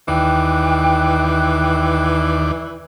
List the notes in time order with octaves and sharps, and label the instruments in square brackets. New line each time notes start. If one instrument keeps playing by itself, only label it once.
[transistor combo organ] D#2 D5 [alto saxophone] E3 [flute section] G5 F#6